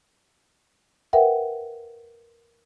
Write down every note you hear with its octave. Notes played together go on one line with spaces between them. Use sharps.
A#4 B4 E5 F#5 G5